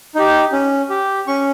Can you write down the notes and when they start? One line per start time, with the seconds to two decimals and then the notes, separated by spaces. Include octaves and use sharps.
0.15 D#4 G4
0.52 C#4
0.90 G4
1.27 C#4 C#6